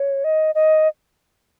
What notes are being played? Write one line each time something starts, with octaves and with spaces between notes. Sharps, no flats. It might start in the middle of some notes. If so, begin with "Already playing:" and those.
Already playing: C#5
D#5
D#5